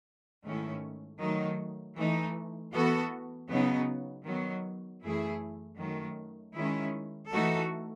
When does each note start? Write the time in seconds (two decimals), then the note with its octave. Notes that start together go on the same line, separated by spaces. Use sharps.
0.44 G#2 D#3 A3 C#4 E4
1.19 D#3 F#3 A3 D#4
1.96 E3 A3 D#4
2.72 E3 B3 F#4 A4
3.49 C#3 F#3 B3 D#4
4.24 D#3 F#3 B3
5.01 F#2 E3 A3 E4 G#4
5.77 F#2 D#3 F#3 A3
6.54 D#3 G#3 C#4 E4
7.30 E3 A3 D#4 F#4 A4